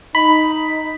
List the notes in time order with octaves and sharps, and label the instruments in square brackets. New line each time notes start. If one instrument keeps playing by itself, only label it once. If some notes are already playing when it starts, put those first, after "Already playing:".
[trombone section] D#4 [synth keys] B5